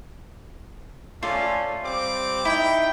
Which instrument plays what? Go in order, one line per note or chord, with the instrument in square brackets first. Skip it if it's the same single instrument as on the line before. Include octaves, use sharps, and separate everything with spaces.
[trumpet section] A3 C#4 A4 [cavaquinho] F4 D5
[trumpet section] G3 C4 D6
[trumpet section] D#4 G5 [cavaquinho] E4